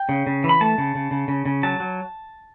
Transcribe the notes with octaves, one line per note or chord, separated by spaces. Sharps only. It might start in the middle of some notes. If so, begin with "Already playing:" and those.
Already playing: G5
C#3
C#3
E3
B5
A3 A5
C#3
C#3
C#3
C#3
C#3
F#3 A5
F#3